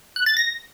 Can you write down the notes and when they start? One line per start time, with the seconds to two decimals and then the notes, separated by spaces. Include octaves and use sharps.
0.16 F#6
0.26 A6
0.37 A#6